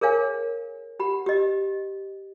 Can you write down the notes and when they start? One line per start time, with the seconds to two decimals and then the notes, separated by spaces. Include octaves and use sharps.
0.01 G#4 A#4 C#5 F5 G#5
1.00 G4 F#5 B5
1.26 G4 D#5